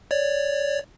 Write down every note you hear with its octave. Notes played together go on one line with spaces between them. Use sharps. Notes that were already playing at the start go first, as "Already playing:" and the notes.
C#5 D5